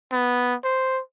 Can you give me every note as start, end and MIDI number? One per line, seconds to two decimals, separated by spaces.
0.12 0.54 59
0.64 1.00 72